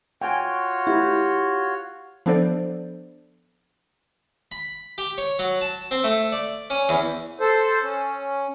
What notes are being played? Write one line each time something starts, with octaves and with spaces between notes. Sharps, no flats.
F4 F#4 C#5 G5 G#5
E4 G4
F3 B3 D4 A4 C5 D5
B5
G4
C#5
F#3
A5
C4
A3
D5
C#4
E2
A4 C5
C#4